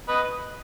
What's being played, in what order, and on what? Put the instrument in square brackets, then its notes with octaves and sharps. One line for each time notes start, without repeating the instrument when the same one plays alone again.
[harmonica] B4 D#5